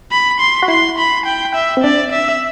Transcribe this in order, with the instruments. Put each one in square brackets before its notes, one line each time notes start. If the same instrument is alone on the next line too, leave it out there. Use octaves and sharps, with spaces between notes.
[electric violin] B5
C6
[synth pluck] F#4
[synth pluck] E4 [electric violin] C6
[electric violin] B5
G5
E5
[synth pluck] C4
[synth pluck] D4 [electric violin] D5
[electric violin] E5